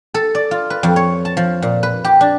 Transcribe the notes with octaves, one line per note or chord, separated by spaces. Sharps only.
A4
D5
F4
B4
F2
C#5
A5
F3
A#2
B4
G4
D4